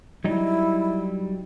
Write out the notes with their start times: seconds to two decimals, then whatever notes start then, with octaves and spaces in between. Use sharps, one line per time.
0.24 F#3 G3 D#4 E4